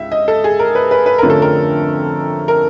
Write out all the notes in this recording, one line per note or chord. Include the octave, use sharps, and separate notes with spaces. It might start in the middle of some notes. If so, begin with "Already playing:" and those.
Already playing: C#2 E5
D#5
A4
G#4
A#4
B4
B4
B4
F2 D3 F3 A3 C#4 A#4
A4
A#4
A#4